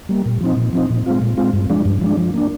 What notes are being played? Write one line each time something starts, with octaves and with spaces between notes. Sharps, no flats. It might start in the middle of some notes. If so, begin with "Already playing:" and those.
G3 A#3
A#2
F3 C4 D#4
A#2
F3 C4 D#4
A#2
G#3 C4 F4
A#2
G#3 C4 F4
G2
F3 G#3 D4
G2
F3 G#3 D4
F3
A#3 D4